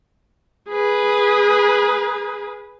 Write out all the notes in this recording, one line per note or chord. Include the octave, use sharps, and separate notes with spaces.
G#4 B4